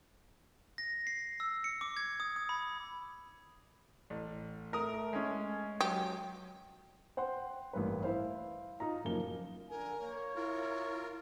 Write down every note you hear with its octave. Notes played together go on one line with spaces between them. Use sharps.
A#6
C7
E6
C#7
D6
G#6
D#6
D#6
B5
A1
A3 A#4 D#6
G#3 C#4
F#3 G4
C5 F#5 G5 C6
A1 G2 A#3 B4
E4 C5 F5
D#4 F4 A#5
F#2 C#3 F3 A#3 G7
D3 A#4 G#5
A#3 C#5
E4 F4 A#4